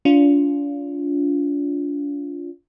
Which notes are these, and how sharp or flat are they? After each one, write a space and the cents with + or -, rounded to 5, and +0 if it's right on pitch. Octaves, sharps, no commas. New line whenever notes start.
D4 -40 F4 +0